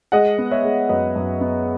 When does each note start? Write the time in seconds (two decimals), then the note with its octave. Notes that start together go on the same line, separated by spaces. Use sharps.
0.12 G#3 D#5 F#5
0.38 B3
0.51 C#5 E5
0.64 G#3
0.89 F#2 B4 D#5
1.16 F#2
1.41 B3